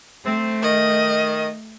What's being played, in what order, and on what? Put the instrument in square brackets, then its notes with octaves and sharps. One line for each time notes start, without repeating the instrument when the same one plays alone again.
[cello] A3 [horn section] C4
[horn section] D#3 [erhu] D#5